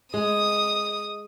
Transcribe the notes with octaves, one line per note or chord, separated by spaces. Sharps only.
G#3 D#6